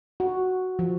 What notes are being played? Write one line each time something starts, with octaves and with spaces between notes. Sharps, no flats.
F#4
F3